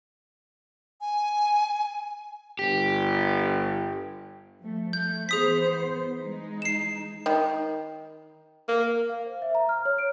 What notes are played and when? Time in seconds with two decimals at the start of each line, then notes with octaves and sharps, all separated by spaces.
1.01 G#5
2.59 G1 G4
4.59 F3 A3
4.93 A3 G6
5.29 E3 B3 G#4 C5 D#6 B6
6.18 E3 G#3 D#4
6.62 C7 E7
7.26 D#3
8.69 A#3
9.09 F5
9.26 C5
9.42 E5
9.55 A#5
9.69 F6
9.85 C#5
9.98 D7